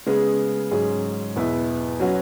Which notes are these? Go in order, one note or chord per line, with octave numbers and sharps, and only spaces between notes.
C#3 G#3 B3 G#4
G#2 F#3 C#4 G#4
E2 B2 B3 E4 B4
F#3 C#4 F#4 B4